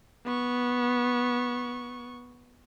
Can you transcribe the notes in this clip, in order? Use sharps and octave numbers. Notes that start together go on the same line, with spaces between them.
B3 C#6